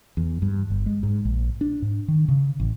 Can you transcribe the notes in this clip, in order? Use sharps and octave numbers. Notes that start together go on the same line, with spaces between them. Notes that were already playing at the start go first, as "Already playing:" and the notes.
E2
G2
G1
G#3
G#2
A#1
D4
G#2
D#3
C#3
A1